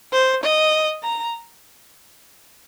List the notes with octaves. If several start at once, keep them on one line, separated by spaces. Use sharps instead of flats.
C5
D#5
A#5